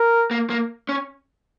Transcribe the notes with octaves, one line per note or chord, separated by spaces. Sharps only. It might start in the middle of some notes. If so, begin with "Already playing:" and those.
Already playing: A#4
A#3
A#3
C#4